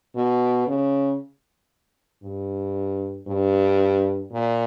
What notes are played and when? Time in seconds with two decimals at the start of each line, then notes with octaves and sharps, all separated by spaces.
0.15 B2
0.67 C#3
2.23 G2
3.27 G2
4.32 A#2